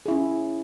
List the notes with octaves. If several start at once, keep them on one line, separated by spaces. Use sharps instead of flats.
C#4 E4 G#4